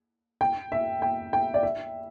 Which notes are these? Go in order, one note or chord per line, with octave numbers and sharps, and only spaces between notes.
G5
E5
G5
G5
D5
E5